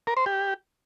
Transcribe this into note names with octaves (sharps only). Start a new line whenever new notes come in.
A#4
C5
G4